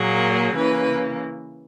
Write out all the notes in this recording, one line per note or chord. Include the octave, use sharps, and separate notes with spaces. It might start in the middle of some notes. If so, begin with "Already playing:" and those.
Already playing: A#2 F#3 A#3 G#4
C#3 E3 A#3 B4